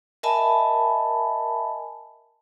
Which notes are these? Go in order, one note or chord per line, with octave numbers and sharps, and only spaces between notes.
A#4 D#5 E5 G#5 A5 B5